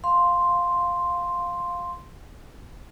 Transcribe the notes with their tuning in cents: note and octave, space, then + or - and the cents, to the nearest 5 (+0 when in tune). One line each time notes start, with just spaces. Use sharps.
F5 +10 C6 +0